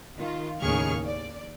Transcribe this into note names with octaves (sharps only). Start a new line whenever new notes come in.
D#3 F4
D#2 A2 C#3 G#4 C#6 F6
D5